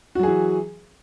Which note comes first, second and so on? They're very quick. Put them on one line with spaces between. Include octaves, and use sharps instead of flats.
F#4 F#3 G#4 E3